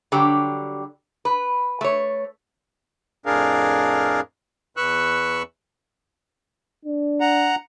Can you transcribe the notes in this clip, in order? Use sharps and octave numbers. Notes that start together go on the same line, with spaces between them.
D3 F#3 G3 G4
B4
A3 C#5
F2 A2 D4 G#4 A#4 F5
E2 B4 C#6 E6 F#6
D4
F#5 A#5